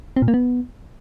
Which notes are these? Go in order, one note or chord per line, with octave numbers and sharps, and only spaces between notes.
C4
A#2
A#3
B3